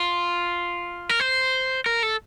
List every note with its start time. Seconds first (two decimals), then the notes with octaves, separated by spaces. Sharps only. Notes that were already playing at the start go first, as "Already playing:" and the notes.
Already playing: F4
1.09 A#4
1.20 C5
1.86 A#4
2.03 A4